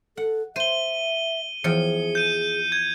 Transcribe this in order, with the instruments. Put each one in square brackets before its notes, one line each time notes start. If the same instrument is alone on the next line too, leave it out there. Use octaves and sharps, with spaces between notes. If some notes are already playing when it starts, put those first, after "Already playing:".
[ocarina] A4 [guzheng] F#5
[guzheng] C5 [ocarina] E5 [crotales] D#7 G7
[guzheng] E2 F3 G5 [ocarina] G#4 [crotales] C#7
[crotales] G6 D#7
G#6